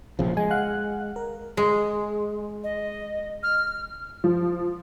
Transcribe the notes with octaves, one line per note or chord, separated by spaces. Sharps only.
A#1 C#3 F3
G#3 G#5
F5 F#5 F#6
A#4
G#3
D#5
F6
F3